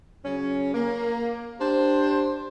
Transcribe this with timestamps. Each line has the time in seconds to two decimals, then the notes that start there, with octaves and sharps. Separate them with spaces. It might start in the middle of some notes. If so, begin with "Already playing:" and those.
0.24 C#3 F#3 C#4
0.75 A#3
1.60 D4 G4 C5